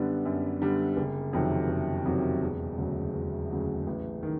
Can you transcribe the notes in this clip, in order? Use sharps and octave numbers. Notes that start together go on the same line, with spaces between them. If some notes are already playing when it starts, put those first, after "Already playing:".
Already playing: F#2 D3 G3 B3
F#2
D3 G3 B3
F#1
F2 C3 D#3 F#3
F#1
F2 C3 D#3 F#3
E1
D2 C#3 F#3
E1
D2 C#3 F#3
A1
D#3